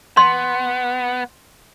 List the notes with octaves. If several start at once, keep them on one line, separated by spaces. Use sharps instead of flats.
B3 C6